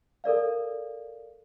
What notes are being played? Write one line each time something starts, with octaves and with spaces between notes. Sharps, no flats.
A4 A#4 D5 F5